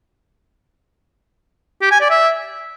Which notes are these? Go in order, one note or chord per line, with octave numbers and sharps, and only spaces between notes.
G4
G#5
D5
E5